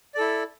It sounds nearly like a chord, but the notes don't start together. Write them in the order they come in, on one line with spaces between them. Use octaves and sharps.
D5 A4 E4